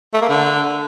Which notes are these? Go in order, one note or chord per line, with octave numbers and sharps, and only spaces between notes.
A3
A#3
D3